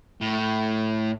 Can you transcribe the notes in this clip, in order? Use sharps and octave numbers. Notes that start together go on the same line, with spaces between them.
A2